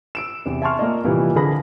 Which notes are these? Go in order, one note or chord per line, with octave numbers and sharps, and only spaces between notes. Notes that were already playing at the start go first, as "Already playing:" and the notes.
E6 D7 E7
E2 C3
E5 G#5 A5 C6 C#6 F6
A#3 F4 D5 D#5
C2 A#2 E3 F3 G3 A#3
D3 F3 F4 G#4 B5 A#6